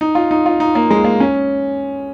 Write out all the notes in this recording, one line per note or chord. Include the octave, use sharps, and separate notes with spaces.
D#4
F4
D#4
F4
D#4
A#3
G#3
A#3
C#4